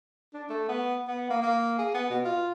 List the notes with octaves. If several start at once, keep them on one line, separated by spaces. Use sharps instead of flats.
D4
A3
B3
B3
A#3
A#3
G#4
B3
B2
F4